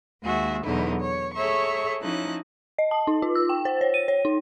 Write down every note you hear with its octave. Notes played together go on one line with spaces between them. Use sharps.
D#2 G#3 F#4 G#4 E5
E2 B2 D3 F#3 D#4 E4
C#5
G#4 A4 C#5 E5 A#5 C#6
F3 C#4 D#4 E4 A5 F#6
D#5
A5
D#4
F4
E6
G5
C5
C#5
D#7
C#5
D#4